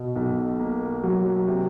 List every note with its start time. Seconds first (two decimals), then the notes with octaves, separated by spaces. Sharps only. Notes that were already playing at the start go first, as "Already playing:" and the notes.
Already playing: B2
0.16 B1
0.60 A#3
1.04 F#3
1.47 C3